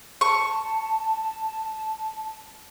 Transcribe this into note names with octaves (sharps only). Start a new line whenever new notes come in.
A5 C#6